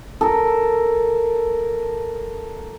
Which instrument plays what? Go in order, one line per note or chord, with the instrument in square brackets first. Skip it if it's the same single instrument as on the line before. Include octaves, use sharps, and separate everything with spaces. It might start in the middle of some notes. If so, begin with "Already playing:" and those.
[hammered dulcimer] A4 A#4